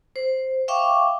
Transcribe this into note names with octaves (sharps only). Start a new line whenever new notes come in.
C5
E5 F5 G5 C#6 D6